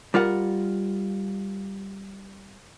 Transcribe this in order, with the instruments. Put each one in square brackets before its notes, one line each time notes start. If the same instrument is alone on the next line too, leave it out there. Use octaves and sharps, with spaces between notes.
[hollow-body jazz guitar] G3 F4 A#4 F#5